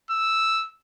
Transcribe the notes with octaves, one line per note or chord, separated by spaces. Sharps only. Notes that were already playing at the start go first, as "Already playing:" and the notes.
E6